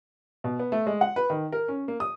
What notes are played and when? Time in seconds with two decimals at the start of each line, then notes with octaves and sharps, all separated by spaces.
0.44 B2
0.59 B3
0.72 A3
0.87 G#3
1.01 F#5
1.16 B4
1.30 D#3
1.52 A#4
1.68 C#4
1.88 A#3
2.00 D#6